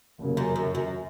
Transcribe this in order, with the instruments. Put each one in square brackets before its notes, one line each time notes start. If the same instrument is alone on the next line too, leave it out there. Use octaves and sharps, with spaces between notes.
[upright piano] F1 D#2 C#3 F#3 A#3
[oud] F#2
F#2
F#2